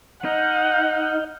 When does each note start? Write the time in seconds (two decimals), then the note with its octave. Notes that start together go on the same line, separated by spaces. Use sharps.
0.25 D#4 D#5 F#5 F6 G6